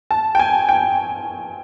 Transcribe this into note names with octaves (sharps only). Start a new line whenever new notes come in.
A5
G5
G#5
G5